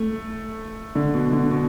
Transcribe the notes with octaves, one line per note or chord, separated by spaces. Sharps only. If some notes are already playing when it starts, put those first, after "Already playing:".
Already playing: A3
D3
B2
D3
B2